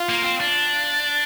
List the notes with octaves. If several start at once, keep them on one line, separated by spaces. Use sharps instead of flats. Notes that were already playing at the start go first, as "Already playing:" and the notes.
Already playing: F4
A#3
C4
D4